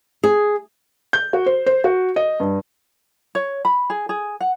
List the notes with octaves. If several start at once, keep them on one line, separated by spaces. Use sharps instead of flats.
G#4
G6
F#4
C5
C5
F#4
D#5
G2
C#5
B5
G#4
G#4
F#5